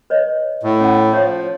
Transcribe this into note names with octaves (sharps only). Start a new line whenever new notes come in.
B4 C#5 D#5
A2
C#4 F#5
F3 C#5 F5